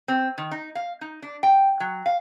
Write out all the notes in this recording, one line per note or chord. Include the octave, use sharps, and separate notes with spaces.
C4
D#3
D#4
F5
D#4
D4
G5
F#3
F5